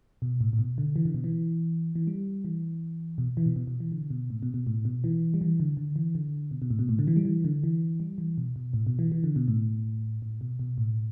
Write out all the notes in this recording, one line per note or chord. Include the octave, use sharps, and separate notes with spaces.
B2
A2
A2
B2
D3
E3
D3
B2
E3
E3
G3
E3
B2
E3
B2
B2
B2
E3
D3
B2
A2
B2
B2
A2
B2
E3
G3
E3
D3
D3
E3
D3
B2
B2
A2
B2
A2
D3
E3
G3
E3
D3
E3
G3
E3
B2
B2
A2
B2
E3
E3
D3
B2
A2
A2
B2
B2
A2